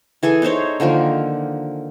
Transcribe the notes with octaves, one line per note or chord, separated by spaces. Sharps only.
E3 G#4 A4 G#5
D#4 E4 C5 C#5
D3 D#3 F3 A#3